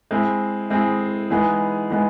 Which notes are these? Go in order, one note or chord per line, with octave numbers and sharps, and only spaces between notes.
G#3 C4 E4 G#4
G#3 C4 E4 G#4
E3 G#3 B3 D#4 G#4
E3 G#3 B3 D#4 G#4